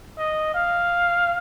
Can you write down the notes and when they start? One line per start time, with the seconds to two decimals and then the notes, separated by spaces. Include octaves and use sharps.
0.18 D#5
0.55 F5